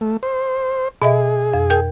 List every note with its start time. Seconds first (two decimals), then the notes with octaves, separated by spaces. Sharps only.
0.01 A3
0.23 C5
1.02 B2 G#4 D#5 E5
1.54 F2
1.70 A#4 G5 G6